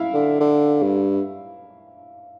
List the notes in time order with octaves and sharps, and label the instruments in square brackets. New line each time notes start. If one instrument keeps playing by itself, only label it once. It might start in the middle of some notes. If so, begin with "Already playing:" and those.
Already playing: [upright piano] E4 E5 F5
[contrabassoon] D3
D3
G2